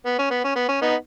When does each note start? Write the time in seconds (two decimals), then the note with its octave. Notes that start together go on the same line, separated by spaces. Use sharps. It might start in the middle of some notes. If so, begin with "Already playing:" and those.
0.06 B3
0.19 C#4
0.30 B3
0.44 C#4
0.55 B3
0.69 C#4
0.82 B3 D#4